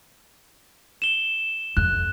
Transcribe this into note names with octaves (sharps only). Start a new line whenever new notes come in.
E7 G7
F2 F#6